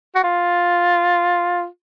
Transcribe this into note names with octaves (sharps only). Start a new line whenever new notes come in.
F#4
F4